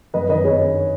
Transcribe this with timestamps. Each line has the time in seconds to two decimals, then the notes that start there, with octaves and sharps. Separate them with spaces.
0.14 F#2 B4 D#5
0.29 D#3 B4 D#5
0.44 G#4 C#5